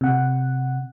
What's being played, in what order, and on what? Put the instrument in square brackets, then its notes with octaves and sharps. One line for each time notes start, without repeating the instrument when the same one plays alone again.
[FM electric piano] C3 F#5